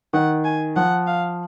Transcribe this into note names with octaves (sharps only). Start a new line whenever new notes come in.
D#3 F#5
G#5
F3 F#5
F5